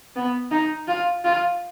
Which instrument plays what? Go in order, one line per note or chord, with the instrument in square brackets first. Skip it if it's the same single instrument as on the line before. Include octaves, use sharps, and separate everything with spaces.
[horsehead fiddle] B3
D#4
F4
F4